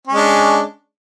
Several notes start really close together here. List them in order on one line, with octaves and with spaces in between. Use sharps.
C#4 G#3 D4